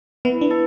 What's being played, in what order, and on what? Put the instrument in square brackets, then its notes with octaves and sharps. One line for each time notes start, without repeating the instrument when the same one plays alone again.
[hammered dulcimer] E3 [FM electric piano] B3
[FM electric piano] D4
[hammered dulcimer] A4